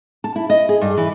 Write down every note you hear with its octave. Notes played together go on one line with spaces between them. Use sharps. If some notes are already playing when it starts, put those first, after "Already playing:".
A5
E4
D#5
G#4
G2
E3